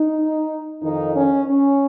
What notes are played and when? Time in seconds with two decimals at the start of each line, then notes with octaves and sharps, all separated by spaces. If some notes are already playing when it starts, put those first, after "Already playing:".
Already playing: D#4
0.82 F2 D#3 D#4
1.14 C#4
1.46 C#4